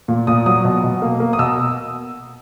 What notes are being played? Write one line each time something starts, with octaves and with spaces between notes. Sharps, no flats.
A#2
A#2 D#6
F#3 D#6
B2
B2
A#3
A#3
D#6
B2 E6